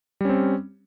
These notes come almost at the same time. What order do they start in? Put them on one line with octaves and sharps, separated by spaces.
G3 C#4 C4